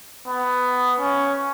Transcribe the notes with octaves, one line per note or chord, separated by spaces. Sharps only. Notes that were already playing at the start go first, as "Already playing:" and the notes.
B3
C#4